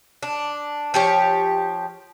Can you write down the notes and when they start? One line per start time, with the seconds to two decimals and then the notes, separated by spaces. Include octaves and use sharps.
0.23 D4
0.94 F3 G4 C#5